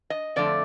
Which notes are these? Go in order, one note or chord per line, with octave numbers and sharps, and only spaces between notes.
D#5
F2 D3 F3 A3 D5